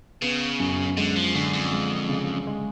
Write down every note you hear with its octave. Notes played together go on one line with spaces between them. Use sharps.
C#3 B3
F#2
D3 G#3
F3
F#2 D3
F2
G#3
C#3
G#3